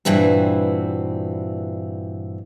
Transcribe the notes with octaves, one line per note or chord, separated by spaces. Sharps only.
G2 A#2 E3 C4 F#4